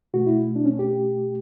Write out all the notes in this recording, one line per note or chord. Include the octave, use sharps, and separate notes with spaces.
B2 A3 F#4
E4
D4
C#4
G4